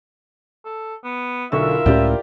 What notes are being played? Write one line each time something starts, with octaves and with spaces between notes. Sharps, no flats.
A4
B3
B1 D3 E4 F4 A#4 E5 C#6
C#2 A2 C#4 G4 D5 G5